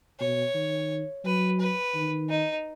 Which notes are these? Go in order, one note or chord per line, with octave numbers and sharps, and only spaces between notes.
B2 C#5
D#3
F#3 B4
B4
D#3
D#4